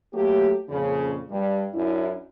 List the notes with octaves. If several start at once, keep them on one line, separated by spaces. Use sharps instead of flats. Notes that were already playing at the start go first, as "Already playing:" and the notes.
F#3 A3 A#3 G4
F2 A#2 C#3
G2 G3
F#2 D4 E4